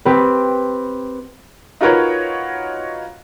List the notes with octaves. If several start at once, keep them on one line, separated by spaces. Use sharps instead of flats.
C4 G4 B4
D#4 F4 F#4 A#4 B4 C#5